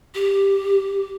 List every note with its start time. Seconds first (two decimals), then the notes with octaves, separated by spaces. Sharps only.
0.15 G4